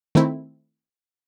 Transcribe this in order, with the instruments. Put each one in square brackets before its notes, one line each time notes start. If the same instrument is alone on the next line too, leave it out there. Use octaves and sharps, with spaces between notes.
[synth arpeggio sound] D#3 A3 C4 E4